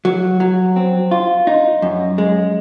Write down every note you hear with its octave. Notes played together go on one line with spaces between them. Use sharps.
F#3
F#3
C4
F4
D#4
F#2
G#3